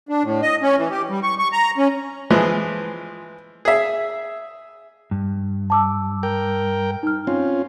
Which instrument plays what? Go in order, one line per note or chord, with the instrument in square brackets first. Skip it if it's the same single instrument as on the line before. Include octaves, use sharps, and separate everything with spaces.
[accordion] D4
A2
D#5
C#4
E3
G4
G3
C#6
C#6
A#5
C#4
[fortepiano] E3 F3 G#3
G#4 E5
[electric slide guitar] G2
[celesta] A5 D6 E6
[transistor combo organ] A#4 G5
[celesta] D#4 F6
[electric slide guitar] C4 [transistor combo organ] C#4 F4